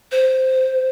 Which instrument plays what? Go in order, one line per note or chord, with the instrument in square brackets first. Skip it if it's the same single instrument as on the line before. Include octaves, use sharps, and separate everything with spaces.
[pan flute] C5